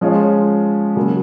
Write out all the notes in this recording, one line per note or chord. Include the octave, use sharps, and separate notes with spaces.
F3 G#3 C#4 F4
C#3 F#3 A#3